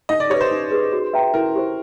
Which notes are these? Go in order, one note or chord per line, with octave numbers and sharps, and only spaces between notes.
D#4 D#5
D5
G4 B4 C#5
C5
D#4
G#4 B4
F#4
B4 E5 G5 A#5
E4 A#4
G4 C5